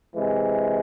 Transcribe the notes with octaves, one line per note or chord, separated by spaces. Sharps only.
C3 E3 G#3